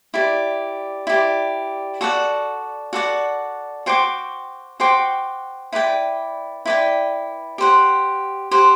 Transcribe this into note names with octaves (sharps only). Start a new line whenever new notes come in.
E4 G4 D5
E4 G4 D5
F#4 A4 D5 F#5
F#4 A4 D5 F#5
F#4 C5 G5 D6
F#4 C5 G5 D6
E4 B4 D5 G5
E4 B4 D5 G5
G4 C5 F#5
G4 C5 F#5